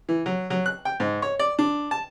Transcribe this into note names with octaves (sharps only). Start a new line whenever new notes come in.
E3
F#3
F#3
F#6
G5
G#2
C#5
D5
D4
A5